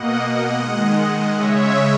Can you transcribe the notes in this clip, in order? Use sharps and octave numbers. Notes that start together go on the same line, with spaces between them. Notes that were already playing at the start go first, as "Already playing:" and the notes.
Already playing: B2 A#3 D#5 F#5
D#3 G#3
C#3 G#3 C#5 E5